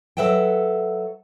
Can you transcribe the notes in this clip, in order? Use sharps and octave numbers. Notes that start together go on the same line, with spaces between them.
F#3 A4 B4 E5 F#5 G5